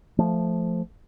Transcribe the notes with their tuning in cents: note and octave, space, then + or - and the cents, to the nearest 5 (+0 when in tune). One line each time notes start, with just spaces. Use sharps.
F3 +0 A3 +0